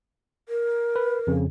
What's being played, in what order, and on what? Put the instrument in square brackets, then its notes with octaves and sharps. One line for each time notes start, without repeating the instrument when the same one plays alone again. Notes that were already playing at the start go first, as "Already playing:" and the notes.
[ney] A#4
[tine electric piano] B4
F2 C#3